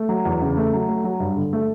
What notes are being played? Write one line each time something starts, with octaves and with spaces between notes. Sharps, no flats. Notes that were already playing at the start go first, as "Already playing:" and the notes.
Already playing: A3
F#3
E2
C#3
A3
F#3
A3
F#3
G2
D3
A3